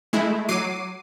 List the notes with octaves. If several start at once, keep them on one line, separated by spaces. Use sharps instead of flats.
G#3 A3 E4
F#3 D6 C7 D#7